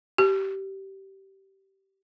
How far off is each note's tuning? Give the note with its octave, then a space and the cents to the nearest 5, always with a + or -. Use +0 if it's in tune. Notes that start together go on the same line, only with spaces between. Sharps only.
G4 -20